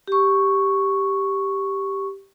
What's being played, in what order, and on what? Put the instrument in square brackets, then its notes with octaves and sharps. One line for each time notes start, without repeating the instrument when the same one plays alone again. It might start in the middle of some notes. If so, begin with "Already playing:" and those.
[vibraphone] G4 C#6